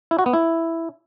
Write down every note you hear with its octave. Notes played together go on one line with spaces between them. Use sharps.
E4
F#4
B3
E4